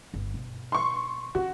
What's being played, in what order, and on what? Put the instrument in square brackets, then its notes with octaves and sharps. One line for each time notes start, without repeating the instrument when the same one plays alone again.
[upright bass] G1
B2
[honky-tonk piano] C6 C#6
[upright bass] C#4 [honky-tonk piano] F#4